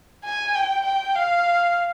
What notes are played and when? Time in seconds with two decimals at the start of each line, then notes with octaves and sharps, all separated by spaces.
0.25 G#5
0.55 G5
0.86 G5
1.15 F5